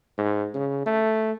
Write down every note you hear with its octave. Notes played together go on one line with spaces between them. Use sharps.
G#2
C#3
A3